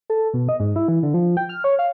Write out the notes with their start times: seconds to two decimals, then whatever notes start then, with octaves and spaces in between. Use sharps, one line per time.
0.10 A4
0.34 B2
0.49 D#5
0.60 G#2
0.76 E4
0.88 E3
1.03 D3
1.14 F3
1.37 G5
1.49 F6
1.64 C#5
1.79 F5